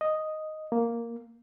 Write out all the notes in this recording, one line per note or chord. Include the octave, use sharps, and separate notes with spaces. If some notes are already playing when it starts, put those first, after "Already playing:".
D#5
A#3